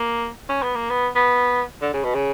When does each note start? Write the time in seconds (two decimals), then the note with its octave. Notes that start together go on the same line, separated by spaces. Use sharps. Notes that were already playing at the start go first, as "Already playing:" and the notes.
Already playing: A#3
0.49 C#4
0.63 B3
0.76 A#3
0.90 B3
1.16 B3
1.82 D3
1.93 C#3
2.04 B2
2.15 C#3